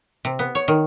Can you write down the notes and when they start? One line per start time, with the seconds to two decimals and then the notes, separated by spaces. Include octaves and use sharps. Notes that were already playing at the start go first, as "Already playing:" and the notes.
0.25 C3
0.39 B3
0.55 C#5
0.68 D#3